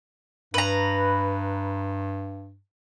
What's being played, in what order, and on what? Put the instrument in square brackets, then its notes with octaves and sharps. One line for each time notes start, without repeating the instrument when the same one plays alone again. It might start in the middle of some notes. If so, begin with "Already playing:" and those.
[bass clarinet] G2 [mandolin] B4 A#5